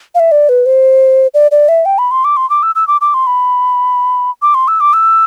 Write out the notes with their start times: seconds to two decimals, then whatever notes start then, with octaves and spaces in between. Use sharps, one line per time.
0.15 F5
0.20 E5
0.32 D5
0.49 B4
0.66 C5
1.34 D5
1.51 D5
1.69 E5
1.85 G5
1.98 B5
2.11 C6
2.25 D6
2.37 C6
2.50 D6
2.63 E6
2.75 E6
2.88 D6
3.01 D6
3.14 C6
3.27 B5
4.42 D6
4.54 C6
4.68 E6
4.80 D6
4.93 E6